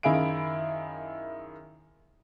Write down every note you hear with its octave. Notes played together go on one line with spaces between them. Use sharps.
F#2 D#3 E4 G#4 F5 D7